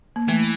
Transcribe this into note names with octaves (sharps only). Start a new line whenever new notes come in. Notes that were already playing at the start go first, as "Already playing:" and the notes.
A#3
E3 A3